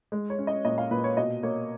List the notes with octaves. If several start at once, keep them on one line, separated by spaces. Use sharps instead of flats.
G#3
C#5
C#4
D#5
A#2 D#5
F5
A#2 B4
C#5
B2 D#5
A#3 C#5